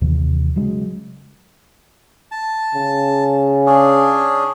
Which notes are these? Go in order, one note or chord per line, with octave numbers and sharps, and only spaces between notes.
D#2 C3 E3
C#3 F#3 G#3
A5
C#3
C#4 D4 G#4